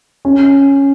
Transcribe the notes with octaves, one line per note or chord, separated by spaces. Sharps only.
C#4